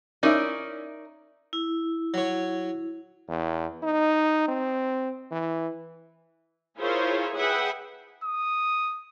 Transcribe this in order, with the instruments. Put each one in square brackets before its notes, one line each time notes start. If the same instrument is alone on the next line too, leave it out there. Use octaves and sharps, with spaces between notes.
[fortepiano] C#4 E4 [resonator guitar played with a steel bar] D#4 A#4 D5
[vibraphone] E4
[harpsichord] F#3 C#5
[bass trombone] E2
D#4
C4
E3
[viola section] E4 F4 G#4 A#4 C5 C#5
G#4 B4 E5 F#5 G5
[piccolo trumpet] D#6